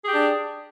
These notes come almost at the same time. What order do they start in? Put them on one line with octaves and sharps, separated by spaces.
G#4 G4 D4